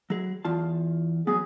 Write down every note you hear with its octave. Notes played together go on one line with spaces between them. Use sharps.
F#3 G#4
E2 F4 A5
F#3 B3 G#4